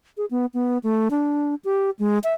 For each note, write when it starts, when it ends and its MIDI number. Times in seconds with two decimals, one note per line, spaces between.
0.17 0.26 68
0.31 0.46 59
0.54 0.78 59
0.83 1.08 57
1.11 1.55 62
1.65 1.90 67
1.99 2.19 56
2.24 2.34 76